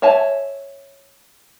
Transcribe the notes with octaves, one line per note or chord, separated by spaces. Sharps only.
C#5 E5 G#5 A5